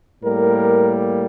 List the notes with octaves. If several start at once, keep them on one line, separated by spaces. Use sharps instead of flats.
A2 G3 A#3 A#4